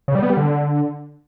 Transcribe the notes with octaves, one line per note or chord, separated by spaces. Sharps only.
C#3
G3
B3
G3
D3